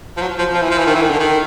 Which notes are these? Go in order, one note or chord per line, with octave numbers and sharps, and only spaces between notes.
F3
F#3
F3
F3
E3
F3
E3
D#3
E3
D#3
D3
D#3